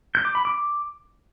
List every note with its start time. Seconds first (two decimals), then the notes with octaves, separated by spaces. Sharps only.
0.15 G6
0.25 D6
0.35 B5
0.45 D6